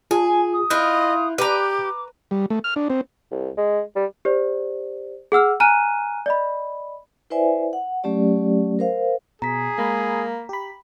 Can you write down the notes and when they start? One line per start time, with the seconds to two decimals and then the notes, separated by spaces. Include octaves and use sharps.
0.11 F4 G#4
0.24 G#5
0.53 D#6
0.70 E4 F4 D#5 F#6 G6
1.38 G4 B4 A#5 D6
2.31 G3
2.50 A3
2.64 F6
2.76 D4
2.90 C4
3.31 C2
3.57 G#3
3.96 G3
4.25 G4 C5 D5
5.32 G#4 F#5 E6 F6
5.60 G#5 A#5 F6 F#6 D#7
6.26 D5 D#5 B5
7.30 E4 B4 C5 D5 E5 G#5
7.73 F#5
8.04 F#3 A3 C#4 G4 D5
8.79 A#4 C5 F5
9.42 B2 G#4 A#5 B6
9.78 G#3 A#3 B5
10.49 G4 B5